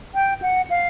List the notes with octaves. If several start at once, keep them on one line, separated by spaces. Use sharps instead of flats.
G5
F#5
F5